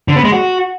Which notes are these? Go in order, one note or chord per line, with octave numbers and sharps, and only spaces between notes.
D3
B3
G#3
F#4